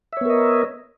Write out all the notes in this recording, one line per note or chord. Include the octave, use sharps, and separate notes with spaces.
B3 A#4 C#5 D#5 E5